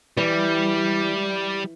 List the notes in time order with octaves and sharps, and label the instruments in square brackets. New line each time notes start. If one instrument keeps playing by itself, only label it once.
[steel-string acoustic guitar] E3 [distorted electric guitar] G3